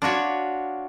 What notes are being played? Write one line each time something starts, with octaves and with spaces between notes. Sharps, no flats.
D4 F4 F#4 C#5